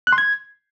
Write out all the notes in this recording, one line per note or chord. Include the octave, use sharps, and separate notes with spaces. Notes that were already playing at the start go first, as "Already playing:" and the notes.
F#6
C6
G#6